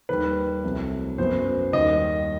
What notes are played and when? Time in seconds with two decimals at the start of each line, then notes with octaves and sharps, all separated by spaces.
0.09 D#2 D#3 G3 B4
0.64 C2 C3 F#3 A3
1.18 F#2 F#3 B3 C5
1.73 D#2 D#3 G3 D#5